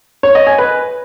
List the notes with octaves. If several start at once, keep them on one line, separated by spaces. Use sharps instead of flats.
C#5
D#5
G#5
B4